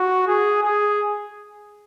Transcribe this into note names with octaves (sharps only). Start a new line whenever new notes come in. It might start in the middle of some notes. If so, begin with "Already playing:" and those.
Already playing: F#4
G#4
G#4